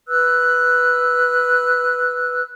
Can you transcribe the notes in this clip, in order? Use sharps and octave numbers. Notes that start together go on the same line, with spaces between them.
B4 E6 F#6